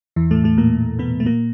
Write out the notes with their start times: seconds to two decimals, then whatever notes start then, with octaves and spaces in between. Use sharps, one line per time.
0.16 E2 E3
0.31 A2 A3
0.44 A2 A3
0.58 A#2 A#3
0.99 B2 B3
1.20 A3
1.26 A#2 A#3